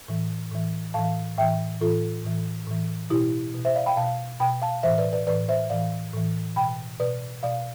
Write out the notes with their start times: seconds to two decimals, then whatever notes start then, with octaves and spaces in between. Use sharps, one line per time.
0.08 A2 E3
0.52 A2 E3
0.94 A2 E3 F5 A5
1.38 A2 E3 E5 G5
1.81 A2 E3 F4 A4
2.24 A2 E3
2.67 A2 E3
3.10 B2 E4 G4
3.54 B2
3.65 C5 E5
3.75 D5 F5
3.86 G5 B5
3.97 B2 F5 A5
4.40 B2 G5 B5
4.62 F5 A5
4.83 A2 E3 C5 E5
4.98 B4 D5
5.13 B4 D5
5.27 A2 E3 B4 D5
5.49 C5 E5
5.70 A2 E3 D5 F5
6.13 A2 E3
6.56 B2 G5 B5
7.00 B2 B4 D5
7.43 B2 D5 F5